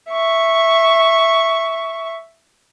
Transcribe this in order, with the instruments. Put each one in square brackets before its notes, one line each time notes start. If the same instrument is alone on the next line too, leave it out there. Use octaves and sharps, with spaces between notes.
[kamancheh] E5 C#6